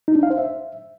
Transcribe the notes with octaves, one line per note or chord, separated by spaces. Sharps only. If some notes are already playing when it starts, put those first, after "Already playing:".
D#4
D4
F5
C5
E5